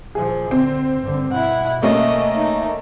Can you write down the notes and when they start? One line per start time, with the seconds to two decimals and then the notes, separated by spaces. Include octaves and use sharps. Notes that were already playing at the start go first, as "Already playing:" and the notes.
0.15 A#2 F3 G#4
0.51 D3 C4
1.01 G2 D3
1.31 B2 E4 F#5
1.83 A3 A#3 C#4 D#5
2.35 D#4